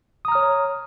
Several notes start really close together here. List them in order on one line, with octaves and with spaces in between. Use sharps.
D#6 A#5 F6 C#5